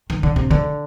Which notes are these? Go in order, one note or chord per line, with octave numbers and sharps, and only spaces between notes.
D#3
D3
C3
D3